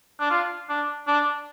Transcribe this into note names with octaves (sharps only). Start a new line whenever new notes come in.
D4
F4
D4
D4